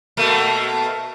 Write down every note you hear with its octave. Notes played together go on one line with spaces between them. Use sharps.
B2 A3 A#3